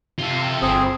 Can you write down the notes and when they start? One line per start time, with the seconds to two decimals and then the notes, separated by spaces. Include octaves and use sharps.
0.19 C3 F4 A4
0.62 G1 C4 G#4